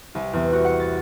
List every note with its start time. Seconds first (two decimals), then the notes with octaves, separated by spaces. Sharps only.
0.15 C2
0.33 E2
0.53 F#4
0.65 F#5
0.80 A6